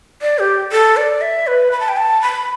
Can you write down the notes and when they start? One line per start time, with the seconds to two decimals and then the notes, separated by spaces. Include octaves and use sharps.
0.22 D5
0.39 G4
0.72 A4
0.97 D5
1.21 E5
1.47 B4
1.72 B5
1.80 A5
1.89 G5
1.97 A5
2.22 B5